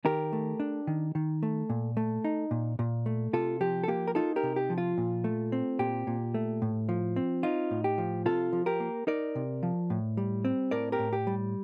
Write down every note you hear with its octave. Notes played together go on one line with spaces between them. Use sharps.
D#3 G4 A#4
A3
D4
D#3
D#3
A3
A#2
A3
D#4
A#2
A#2
A3
C3 F4 A4
F3 G4
A4
A#3 G4
A#4
D#4 F4 A4
G4 A#4
C3
G4
F3
F4
A#2
A3
C4
A#2 G4
A#2
A3
A2
F3
C4
D#4 F4
A2
G4
F3
C3 F4 A4
F3
G4 A#4
A#3
D#4 A#4 D5
C3
F3
A2
G3
C4
A2 A#4 D5
G4 A#4
A2
G4
G3